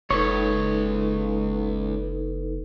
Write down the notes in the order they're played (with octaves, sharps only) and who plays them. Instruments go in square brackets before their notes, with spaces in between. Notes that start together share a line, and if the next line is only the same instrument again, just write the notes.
[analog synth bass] F#1 [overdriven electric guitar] C#2 [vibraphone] D#4 A4 B4 [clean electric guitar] C#5